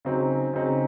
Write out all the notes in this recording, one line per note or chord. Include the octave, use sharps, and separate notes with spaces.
C#3 F#3 C4 D#4
C#3 F#3 C4 D#4